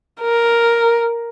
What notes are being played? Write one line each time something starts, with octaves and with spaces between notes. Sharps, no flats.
A#4